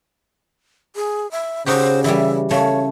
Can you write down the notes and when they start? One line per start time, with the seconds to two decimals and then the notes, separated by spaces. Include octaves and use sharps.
0.96 G#4
1.31 E5
1.66 C#3 D#4 F#4 G4 C5
2.04 E3 G3 E5
2.51 C#3 A3 C#5